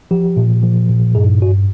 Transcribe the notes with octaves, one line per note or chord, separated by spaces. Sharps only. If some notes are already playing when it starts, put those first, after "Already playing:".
F3 G4
A#2
F3
A#2
G2 G#4
G2 F#4